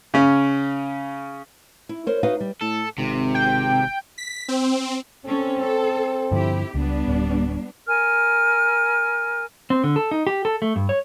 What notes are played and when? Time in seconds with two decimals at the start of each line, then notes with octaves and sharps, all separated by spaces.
0.14 C#3 C#4
1.89 E4
2.07 A#4 C5 C#5
2.23 D#4 F#4 B4 F5
2.40 G3
2.61 A2 A4
2.98 G#1 C3
3.35 G5
4.18 B6
4.48 C4
5.26 C4 C#4 A4
5.59 A4
6.32 G2 D3 F3 E4 G4
6.74 C#2 G3 B3 D4
7.08 D1
7.87 A#4 G#5 F6
9.70 C4
9.84 D3
9.96 A4
10.11 D#4
10.27 G4
10.45 A4
10.62 A3
10.76 G2
10.89 C#5